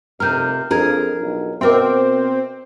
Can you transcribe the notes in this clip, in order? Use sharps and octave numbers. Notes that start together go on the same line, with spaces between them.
F1 C3 A#4 F6 G6
F2 D4 F4 G#4 A#4 G#6
B1
B2 C4 A#4 E5 G5 D6